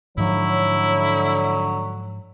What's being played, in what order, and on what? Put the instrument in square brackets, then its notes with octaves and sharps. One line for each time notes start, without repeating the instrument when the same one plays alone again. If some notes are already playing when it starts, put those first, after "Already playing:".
[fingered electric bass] G#2 F3 [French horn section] D3 C#5 [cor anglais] F#3 [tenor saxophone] E4